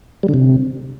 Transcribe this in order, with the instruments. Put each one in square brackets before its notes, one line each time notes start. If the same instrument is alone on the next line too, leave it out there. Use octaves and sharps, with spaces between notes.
[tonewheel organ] G3
D3
C3